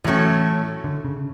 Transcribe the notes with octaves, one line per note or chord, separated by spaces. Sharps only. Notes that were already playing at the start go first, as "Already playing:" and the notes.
A2 E3 F#3 A3 C#4
D3
C#3